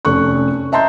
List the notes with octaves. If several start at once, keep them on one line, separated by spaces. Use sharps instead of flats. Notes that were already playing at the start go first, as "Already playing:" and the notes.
F1 A3 C#4 C#6 F#6
D#5 E5 A5 A#5 C6 G6